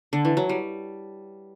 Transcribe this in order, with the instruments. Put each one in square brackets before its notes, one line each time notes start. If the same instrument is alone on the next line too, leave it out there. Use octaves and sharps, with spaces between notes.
[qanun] D3
E3
F#3
G3